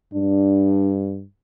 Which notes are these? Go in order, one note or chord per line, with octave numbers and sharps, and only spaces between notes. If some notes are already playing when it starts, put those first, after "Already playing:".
G2 D4